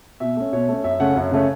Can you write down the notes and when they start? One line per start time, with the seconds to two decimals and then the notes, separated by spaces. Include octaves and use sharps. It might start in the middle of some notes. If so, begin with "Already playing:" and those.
0.20 B2 E5
0.36 A3 C#4
0.52 B2 C#5
0.68 A3 C#4
0.84 F#2 E5
1.00 C#3 A3 C#4 F#5
1.16 F#2
1.31 C#3 A3 C#4